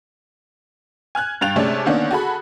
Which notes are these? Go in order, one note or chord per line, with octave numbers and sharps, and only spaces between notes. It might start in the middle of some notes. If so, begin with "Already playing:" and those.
G#5 F6 F#6 G#6
G2 F5 G5 F#6 A6 F7
C3 G#3 A3 C#4 D4
D3 D#3 A#3 B3 C#4 D4
F#4 G#4 A4 B5